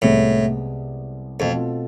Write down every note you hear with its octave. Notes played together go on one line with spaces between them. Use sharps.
C2 A2 C3 G#3 B3
F2 B2 A3 C4 F4 A4